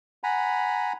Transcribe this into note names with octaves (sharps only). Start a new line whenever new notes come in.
F#5 G#5 A#5 B5